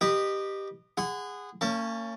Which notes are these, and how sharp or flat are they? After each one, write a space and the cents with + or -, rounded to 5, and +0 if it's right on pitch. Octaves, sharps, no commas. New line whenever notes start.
G4 +0 B4 -10 D#5 -20
G#4 -20 F#5 +0 B5 +45
A#3 -40 C#4 +0 A5 +15